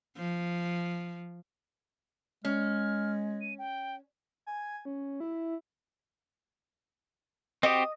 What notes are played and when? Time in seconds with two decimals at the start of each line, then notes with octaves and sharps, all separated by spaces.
0.17 F3
2.45 G#3 C#4 F6
3.41 D#7
3.59 G5
4.47 G#5
4.85 C#4
5.20 E4
7.63 C4 F#4 G4 D#5